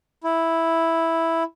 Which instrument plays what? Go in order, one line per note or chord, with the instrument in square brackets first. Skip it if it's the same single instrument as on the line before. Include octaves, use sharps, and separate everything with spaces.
[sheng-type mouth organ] E4